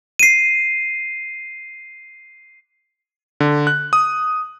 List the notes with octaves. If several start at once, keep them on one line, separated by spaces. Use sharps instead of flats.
C7 D#7
D3
F#6
D#6